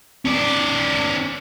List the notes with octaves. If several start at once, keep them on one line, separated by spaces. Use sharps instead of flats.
C#4 D5